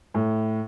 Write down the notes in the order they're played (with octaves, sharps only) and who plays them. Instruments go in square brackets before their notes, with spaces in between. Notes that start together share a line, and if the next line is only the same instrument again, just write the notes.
[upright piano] A2